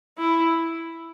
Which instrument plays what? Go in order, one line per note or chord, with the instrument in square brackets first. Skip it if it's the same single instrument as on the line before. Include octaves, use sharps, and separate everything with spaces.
[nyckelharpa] E4